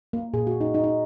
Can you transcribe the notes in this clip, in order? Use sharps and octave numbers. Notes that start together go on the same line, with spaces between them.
A#3
A#2 G#4
F#4
A#3
D#4
A#2 D#4
D#4